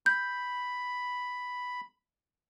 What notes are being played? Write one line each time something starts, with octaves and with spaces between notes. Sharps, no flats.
B5 G6